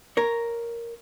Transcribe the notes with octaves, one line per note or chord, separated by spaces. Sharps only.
A#4 C#5